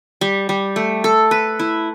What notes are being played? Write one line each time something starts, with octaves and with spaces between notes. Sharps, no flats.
G3
G3
A3
A4
B4
E4